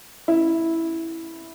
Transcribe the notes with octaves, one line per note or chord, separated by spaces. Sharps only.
E4